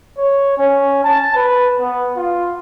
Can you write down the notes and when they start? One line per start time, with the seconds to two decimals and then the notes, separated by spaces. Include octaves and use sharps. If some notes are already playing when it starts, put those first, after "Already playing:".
0.18 C#5
0.58 C#4
1.04 A5
1.35 B4
1.79 B3
2.17 F4